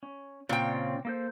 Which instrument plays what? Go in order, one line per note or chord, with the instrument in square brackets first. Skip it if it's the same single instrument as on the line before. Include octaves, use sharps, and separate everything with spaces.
[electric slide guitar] C#4
[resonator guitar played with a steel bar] A#2 G5 [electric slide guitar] C#3 C4 C#4
[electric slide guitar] A#3 A4 C5